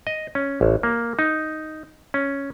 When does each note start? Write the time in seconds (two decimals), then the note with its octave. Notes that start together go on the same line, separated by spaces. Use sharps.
0.07 D#5
0.35 C#4
0.61 A1
0.83 A#3
1.19 D#4
2.14 C#4